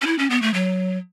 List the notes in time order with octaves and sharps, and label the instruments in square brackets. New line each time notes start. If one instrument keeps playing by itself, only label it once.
[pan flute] C#4
E4
C#4
B3
A3
F#3